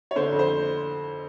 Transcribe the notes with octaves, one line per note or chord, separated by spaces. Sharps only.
C#5
D3 C5
F2
C5